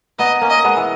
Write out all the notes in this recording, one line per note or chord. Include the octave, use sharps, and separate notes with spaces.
B3 D#4 D#5
A#3 C#4
D#5
G#3 B3
E3